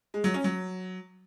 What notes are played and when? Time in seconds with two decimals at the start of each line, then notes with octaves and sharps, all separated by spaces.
0.14 G#3
0.24 F#3
0.34 C#4
0.44 F#3